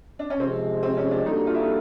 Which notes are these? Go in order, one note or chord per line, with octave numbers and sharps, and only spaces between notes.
D4
C#4
C3 F3 G#3 C4
C4
C#4
D4
G3 A#3 D4 D#4 F#4 A4
F4
E4
D#4